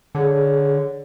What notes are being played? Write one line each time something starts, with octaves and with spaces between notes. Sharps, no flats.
D3 G#4 C#5